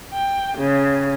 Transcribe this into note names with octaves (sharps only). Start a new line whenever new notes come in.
G5
C#3